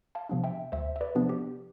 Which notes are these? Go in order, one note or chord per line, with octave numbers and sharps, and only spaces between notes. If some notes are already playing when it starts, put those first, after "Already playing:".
F5 A5
C3 F3 B3 D4
E5 G5
D2 C5 E5
E5
B4 D5
C3 F3 B3 D4
G4